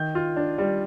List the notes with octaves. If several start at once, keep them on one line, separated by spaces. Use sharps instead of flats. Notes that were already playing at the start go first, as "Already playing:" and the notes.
Already playing: D#3 G6
F4
D4
G3